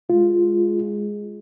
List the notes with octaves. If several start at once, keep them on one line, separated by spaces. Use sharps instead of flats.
G#3 F4